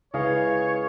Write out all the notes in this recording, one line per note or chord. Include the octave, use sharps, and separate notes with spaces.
C#2 E4 G#4 B4 C#5 D#5 F5